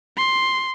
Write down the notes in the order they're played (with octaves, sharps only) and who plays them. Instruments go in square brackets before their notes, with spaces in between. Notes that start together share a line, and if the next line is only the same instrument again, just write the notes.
[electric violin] C6